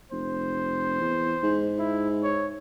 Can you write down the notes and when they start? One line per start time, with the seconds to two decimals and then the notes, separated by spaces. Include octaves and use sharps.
0.12 F1 C5
1.00 E2
1.43 G#2
1.79 E4
2.23 C#5